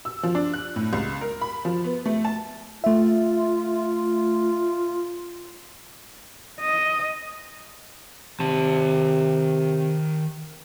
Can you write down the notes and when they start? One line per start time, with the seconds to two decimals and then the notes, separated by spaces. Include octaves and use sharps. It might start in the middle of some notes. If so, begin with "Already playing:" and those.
0.05 E6
0.23 F3
0.35 D4
0.54 F#6
0.76 A2
0.93 C#2
1.21 A#4
1.41 B5
1.65 F3
1.84 B3
2.06 A3
2.25 A5
2.84 A3 F4 E5
6.60 D#5
8.40 C3 D#3 A5